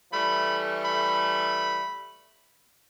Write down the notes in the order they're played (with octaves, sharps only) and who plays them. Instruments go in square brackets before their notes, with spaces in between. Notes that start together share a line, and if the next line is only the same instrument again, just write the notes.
[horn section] E3 G3 A3 [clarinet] B5
[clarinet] B5